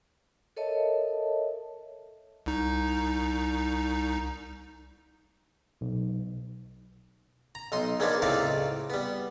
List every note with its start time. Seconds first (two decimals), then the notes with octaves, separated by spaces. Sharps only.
0.57 A4 A#4 C#5 D#5 E5 A5
2.46 C2 D#4
5.81 B1
7.55 A#5
7.72 B1 D#4 C6 D#6
8.00 F#3 G#3 A#3 B3 D4 D#4
8.22 C#2 A2 C4 D#4 D5 F5
8.90 G3 B3